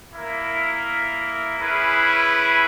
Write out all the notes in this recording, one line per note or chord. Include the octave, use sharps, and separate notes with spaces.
A#3 E4 A#4 E5
C#4 E4 G#4 B4